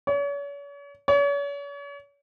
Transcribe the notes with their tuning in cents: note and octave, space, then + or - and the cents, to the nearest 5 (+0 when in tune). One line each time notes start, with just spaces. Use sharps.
C#5 +40
C#5 +40